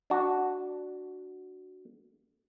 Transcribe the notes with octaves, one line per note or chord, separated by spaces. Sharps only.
D4 F#4